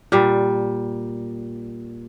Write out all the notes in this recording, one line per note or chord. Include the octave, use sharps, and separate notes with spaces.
A#2 G3